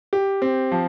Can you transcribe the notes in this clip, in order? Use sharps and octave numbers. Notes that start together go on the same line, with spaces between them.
G4
C4
F3